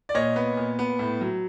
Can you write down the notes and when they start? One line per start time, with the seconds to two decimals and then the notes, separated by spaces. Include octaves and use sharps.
0.09 D5
0.15 A#2 C#5 D#5
0.36 B3
0.57 A#2
0.79 B3
0.99 A2
1.21 F#3